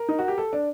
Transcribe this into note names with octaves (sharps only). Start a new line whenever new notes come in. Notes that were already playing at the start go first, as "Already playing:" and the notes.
Already playing: A#4
D#4
F#4
G4
A4
D4